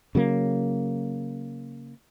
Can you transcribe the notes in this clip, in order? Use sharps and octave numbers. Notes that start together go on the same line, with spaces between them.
C#3 F#3 A#3